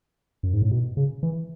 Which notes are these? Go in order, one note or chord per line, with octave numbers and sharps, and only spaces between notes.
F#2
G#2
A2
B2
C#3
E3